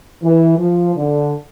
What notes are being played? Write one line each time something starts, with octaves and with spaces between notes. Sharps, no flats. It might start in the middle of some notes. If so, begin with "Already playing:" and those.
E3
F3
D3